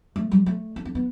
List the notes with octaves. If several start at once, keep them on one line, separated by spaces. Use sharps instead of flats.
A3
G3
A3
D4
C4
B3